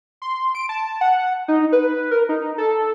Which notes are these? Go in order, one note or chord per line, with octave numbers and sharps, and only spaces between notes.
C6
D7
A5
F#5
D#4
B4
A#4
D#4
A4